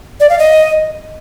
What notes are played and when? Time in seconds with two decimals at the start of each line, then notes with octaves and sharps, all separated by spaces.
0.20 D5
0.30 F5
0.39 D#5